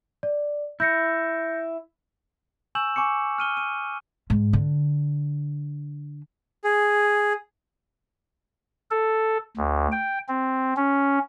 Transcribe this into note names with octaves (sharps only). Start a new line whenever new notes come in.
D5
E4 G6 A#6 C#7
G#5 C#6 E6 G6 E7 F#7
G#5 C#6 D6 C#7
F6 D#7 G7
D#7
G#2
D3
G#4
A4
D2
G5
C4
C#4